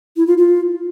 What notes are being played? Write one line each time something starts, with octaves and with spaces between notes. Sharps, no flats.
E4
F4
F4